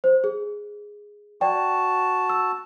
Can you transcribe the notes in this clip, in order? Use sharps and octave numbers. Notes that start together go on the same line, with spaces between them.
C5
G#4
F#4 D5 G5 A5
E6